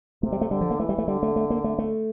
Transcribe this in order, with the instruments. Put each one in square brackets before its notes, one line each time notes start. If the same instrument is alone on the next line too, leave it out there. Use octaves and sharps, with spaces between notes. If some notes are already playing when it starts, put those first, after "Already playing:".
[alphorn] C3 [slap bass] A3
[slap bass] G3
A3
[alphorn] D3 [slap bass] G3
[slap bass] F3
A#3
[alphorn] E3 [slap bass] A3
[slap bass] G3
A3
[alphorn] D3 [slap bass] G3
[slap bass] A3
A3
A#3
A3
A3